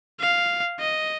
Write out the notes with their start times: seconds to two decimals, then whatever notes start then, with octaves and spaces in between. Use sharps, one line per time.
0.21 F5
0.80 D#5